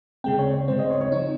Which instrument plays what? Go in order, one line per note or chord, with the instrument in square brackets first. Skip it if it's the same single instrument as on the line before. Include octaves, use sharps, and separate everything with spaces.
[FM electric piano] C#3 G#3 C4 [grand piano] G5
[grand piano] C#5
C#5
[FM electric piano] C#3 G#3 C4 [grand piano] C5
[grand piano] D#5
C#5
C#5
[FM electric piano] F3 C4 D#4